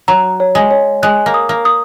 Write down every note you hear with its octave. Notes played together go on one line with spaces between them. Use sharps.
F#3 A#5
C#5
G#3
C#5
G#3 F#6
A#3
D#6
A#3
D#6